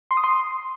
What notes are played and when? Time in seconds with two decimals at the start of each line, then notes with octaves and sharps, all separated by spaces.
0.11 C6
0.17 D#6
0.24 C6